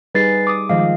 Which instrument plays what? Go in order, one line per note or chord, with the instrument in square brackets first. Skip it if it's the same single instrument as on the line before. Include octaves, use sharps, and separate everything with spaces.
[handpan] G3 D#4 G#4 [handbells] B4 A6 C7
[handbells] D6 D#6
[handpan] D#3 F3 G#3 [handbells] D#5 F5